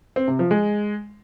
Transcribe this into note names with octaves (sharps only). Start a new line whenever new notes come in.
C4
C3
F3
G#3